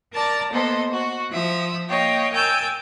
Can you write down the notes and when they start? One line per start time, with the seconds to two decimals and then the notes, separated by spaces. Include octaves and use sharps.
0.13 A#4 D5 A5 A#5 A6
0.51 A#3 B3 A4 C5 D#5
0.91 F#4
1.30 F3 E5 D#6
1.89 A#3 C#5 D#5 F5 G5
2.32 A#4 G5 G#5 E6 G6 A6